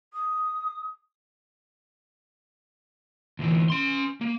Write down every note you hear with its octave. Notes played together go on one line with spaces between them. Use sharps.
D#6
D2 E3
C#4 C6
A#3